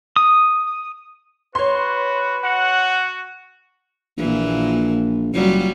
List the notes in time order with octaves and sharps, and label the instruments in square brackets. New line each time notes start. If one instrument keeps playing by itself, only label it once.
[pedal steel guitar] D#6
[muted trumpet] F#4 [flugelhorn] B4 [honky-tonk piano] C#5 C6
[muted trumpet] F#4 [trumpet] F#5
[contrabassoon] A#1 [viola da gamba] A#2 E3
[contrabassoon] F#1 [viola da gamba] F#3 G3 F4